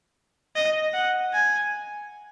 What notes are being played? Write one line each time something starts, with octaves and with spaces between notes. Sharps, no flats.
D#5
F#5
G#5